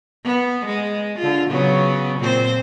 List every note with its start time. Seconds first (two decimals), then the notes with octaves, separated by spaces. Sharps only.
0.24 B3
0.66 G#3
1.19 D3 F4
1.49 C#3 F#3 B3
2.19 A#2 C4 C5